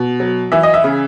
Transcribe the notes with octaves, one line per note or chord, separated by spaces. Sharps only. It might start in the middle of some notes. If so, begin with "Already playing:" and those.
Already playing: B2
F#3
E3 E5
D#5
E5
C#3